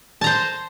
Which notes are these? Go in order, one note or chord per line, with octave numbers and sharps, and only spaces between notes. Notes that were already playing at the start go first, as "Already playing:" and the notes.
C5 A5 A#5